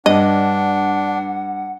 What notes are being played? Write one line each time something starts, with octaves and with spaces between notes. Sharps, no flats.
G2 D4 D#5 F#5